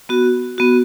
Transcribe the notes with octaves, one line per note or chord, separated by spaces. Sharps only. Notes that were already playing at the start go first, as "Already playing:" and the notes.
B3 F#4
B3 F#4